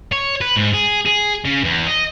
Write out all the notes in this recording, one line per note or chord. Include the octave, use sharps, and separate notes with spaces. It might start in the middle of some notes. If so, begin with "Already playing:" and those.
C#5
B4
G#2
G#4
G#4
C#3
E2
D#5